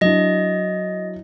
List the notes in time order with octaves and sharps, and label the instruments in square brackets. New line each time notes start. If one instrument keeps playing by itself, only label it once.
[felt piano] F#3 D4 E4 [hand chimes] D#5 A#6